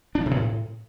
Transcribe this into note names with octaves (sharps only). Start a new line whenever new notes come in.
D4
F3
C3
B2
A2